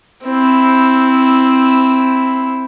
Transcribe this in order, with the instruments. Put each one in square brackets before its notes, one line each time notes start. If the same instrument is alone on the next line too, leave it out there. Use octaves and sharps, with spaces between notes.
[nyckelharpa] C4 E4